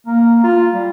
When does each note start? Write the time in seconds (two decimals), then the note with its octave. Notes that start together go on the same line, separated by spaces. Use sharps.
0.06 A#3
0.44 F4
0.74 G3